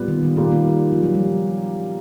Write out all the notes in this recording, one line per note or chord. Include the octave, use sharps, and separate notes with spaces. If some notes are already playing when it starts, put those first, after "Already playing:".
Already playing: A#2 G3 B3
D#3
D#3
A#2 D#3 G3 A#3
D#3
D#3
F3
F#3
G3